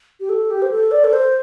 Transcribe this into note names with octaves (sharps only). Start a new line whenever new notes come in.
G4
A4
G4
C5
A4
D5
A4
C5